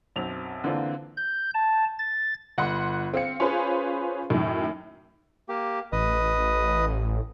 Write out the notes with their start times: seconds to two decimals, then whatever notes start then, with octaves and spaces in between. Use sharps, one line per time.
0.16 B1 F#2 C4 F7
0.64 D3 E3 A#3 C4 F4
1.17 G6
1.54 A5
1.99 A6
2.58 G1 F#5 B5 C6
3.14 C4 F5 C#7
3.40 C#4 F4 G#4 B4 C5
4.30 F#2 A2 D#3
5.49 A#3 G4
5.93 A1 B4 D#5 D#6